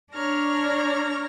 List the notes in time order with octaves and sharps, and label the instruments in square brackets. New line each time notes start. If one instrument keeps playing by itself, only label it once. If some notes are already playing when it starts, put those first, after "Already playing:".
[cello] D4 [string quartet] C#5 A#5 F6